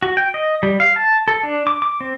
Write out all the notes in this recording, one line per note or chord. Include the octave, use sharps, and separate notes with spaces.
F#4
G5
D#5
G3
F5
A5
A4
D4
D6
D6
C4